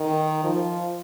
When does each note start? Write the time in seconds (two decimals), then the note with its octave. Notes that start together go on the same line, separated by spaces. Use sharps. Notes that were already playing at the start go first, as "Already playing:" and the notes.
Already playing: D#3
0.44 F3